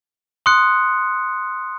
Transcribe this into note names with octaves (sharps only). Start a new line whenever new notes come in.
C6 D#6 F#6 C#7